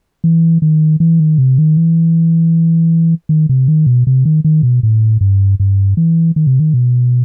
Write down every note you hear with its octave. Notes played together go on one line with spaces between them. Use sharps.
E3
D#3
E3
D#3
C3
D#3
E3
D#3
C3
D#3
B2
C3
D#3
D#3
B2
A2
G2
G2
E3
D#3
C3
D#3
B2